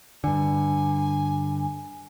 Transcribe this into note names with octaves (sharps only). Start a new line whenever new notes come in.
G2 D3 G#5